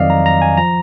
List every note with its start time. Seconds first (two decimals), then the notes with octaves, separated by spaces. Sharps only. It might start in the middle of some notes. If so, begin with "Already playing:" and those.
Already playing: F2 D#3 F#3 D5 D#5 F5
0.10 A#5
0.26 A#5
0.42 G#5
0.57 F3 A#5